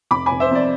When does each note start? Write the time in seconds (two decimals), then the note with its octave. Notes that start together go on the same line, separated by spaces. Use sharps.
0.11 F1 B5 D6
0.26 G#5 B5
0.31 F1
0.40 C5 E5
0.51 F2 D5